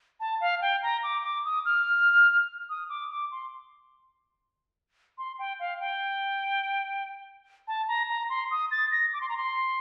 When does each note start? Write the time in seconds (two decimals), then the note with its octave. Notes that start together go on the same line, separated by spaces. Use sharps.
0.20 A5
0.41 F5
0.62 G5
0.83 A#5
1.03 D6
1.24 D6
1.45 D#6
1.65 F6
2.70 D#6
2.90 D6
3.11 D6
3.31 C6
5.18 C6
5.39 G5
5.60 F5
5.80 G5
7.68 A5
7.88 A#5
8.09 A#5
8.30 C6
8.51 D#6
8.71 A6
8.91 A#6
9.13 D6
9.21 C6
9.29 A#5
9.37 C6